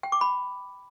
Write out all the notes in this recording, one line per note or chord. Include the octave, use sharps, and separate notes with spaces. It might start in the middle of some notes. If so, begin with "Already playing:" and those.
G5
D6
B5